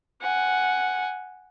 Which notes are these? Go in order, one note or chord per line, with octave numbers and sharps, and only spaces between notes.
F#5 G#5